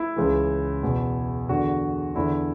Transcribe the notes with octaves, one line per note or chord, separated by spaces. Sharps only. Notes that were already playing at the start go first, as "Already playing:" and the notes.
Already playing: E4
C#2 C#3 E3
E2 B2
E2 D3 F#4
E2 D3 E4